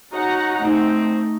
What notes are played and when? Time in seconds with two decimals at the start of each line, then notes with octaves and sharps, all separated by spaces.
0.11 C#4 D#4 F#4 F#5 A#5
0.62 A3 C4 D#4